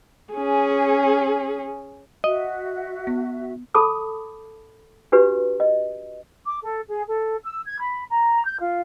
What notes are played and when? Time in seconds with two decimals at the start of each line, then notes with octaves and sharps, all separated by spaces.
0.34 C#4 G#4
2.24 F#4 D#5 E5
3.07 B3
3.74 A4 A5 B5 D6 D#6
5.12 D4 F#4 G4 B4
5.60 D#5
6.45 D6
6.62 A4
6.88 G#4
7.07 A4
7.43 E6
7.65 G#6
7.79 B5
8.09 A#5
8.44 G6
8.59 F4